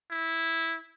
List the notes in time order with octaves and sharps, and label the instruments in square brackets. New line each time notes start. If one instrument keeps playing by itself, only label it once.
[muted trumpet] E4